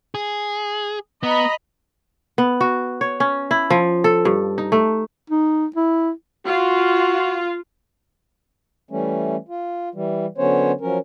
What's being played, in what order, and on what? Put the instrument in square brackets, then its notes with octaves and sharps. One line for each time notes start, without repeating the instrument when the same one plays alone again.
[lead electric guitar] G#4
[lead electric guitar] B3 [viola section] D#5 A#5 B5
[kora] B3
F#4
C#5
C#4
E4
F3
A4
G2
D#4
A3
[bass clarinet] D#4
E4
[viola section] F4 [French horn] F#4
[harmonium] E3 G3 A3 C#4
F4
E3 G3
D3 F#3 B3 C#4 C5 C#5
F3 F#3 C#4 A#4